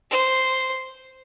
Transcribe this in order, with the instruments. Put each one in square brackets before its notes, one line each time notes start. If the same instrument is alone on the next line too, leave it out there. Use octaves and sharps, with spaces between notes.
[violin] C5